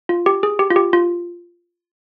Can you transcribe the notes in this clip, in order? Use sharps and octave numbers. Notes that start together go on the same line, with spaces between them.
F4
G4
G#4
G4
F4
G4
F4